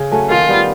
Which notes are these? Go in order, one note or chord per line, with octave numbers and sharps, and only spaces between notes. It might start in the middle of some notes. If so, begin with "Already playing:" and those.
Already playing: C#3
F#3 A3 C#4
D#3 F4
G3 B3